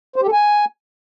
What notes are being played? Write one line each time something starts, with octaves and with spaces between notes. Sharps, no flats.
C5
G4
A4
G#5